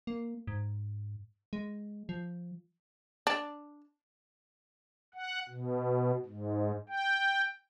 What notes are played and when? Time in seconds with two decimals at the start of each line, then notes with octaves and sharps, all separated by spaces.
0.07 A#3
0.47 G#2
1.53 G#3
2.09 F3
3.27 D4
5.14 F#5
5.49 B2
6.26 G#2
6.89 G5